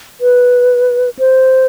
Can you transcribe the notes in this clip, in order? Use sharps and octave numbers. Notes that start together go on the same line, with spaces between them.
B4
C5